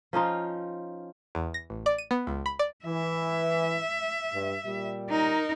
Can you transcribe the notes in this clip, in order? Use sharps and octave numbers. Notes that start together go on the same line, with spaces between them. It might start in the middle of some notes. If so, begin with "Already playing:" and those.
F3 C#4 D#4 F4
E2
A#6
A1
D5
D#7
B3
C#2
B5
D5
E3 E5
G2
A#2 G3
D#4 A#4